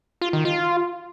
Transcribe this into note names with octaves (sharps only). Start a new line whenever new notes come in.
F4
D#3
F4